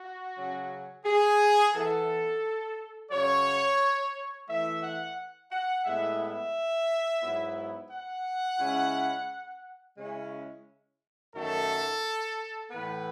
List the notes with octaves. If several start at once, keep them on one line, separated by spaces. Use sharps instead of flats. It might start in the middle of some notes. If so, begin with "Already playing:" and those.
Already playing: F#4
C#3 F#3 C#4
G#4
E3 B3 E4 A4
F#2 C#3 F#3 C#5
E3 A3 E4 E5
F#5
F#5
A2 G#3 B3 E4 E5
E5
G#2 F#3 B3 E4
F#5
C#3 G#3 C#4 E4
C#3 G#3 C#4 E4
F#2 D#3 F#3 A3 A4
A2 E3 B3 B4